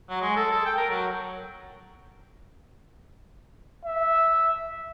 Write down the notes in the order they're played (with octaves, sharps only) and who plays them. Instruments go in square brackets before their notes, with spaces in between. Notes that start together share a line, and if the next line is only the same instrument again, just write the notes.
[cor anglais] F#3
G#3
A4
A4
G5
A#4
F#3
[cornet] E5